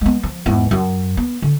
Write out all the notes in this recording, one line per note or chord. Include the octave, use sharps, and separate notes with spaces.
G#3 B3
F3
E2 G#2
F#2
B3
D3